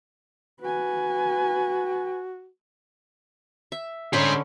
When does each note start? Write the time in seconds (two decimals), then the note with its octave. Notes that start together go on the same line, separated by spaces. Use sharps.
0.62 F#4 B4 G#5
3.72 E5
4.13 D3 C#4 G#4 C5 B5